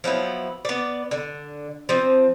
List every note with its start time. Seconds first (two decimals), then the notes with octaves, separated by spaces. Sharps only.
0.04 F3 F#3 B3 E4
0.65 B3 D5
1.11 D3
1.89 F3 C4